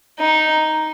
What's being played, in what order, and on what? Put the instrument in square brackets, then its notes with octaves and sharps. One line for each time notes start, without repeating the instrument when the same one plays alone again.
[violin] D#4